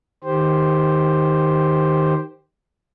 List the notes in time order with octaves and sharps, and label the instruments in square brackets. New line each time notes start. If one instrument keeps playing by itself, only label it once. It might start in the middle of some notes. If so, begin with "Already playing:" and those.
[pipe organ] D#3 G4 C5